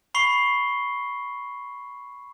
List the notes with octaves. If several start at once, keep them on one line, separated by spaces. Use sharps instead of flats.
B5 C#6 C7 G7